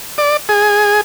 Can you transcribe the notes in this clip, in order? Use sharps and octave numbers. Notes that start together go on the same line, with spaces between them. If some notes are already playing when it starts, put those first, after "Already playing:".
D5
G#4